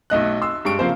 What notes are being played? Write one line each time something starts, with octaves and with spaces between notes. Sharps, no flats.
B1 A3 D#5 F#6
C6 E6
G2 G#3 C#6 D7
C#3 F3 A#3 C5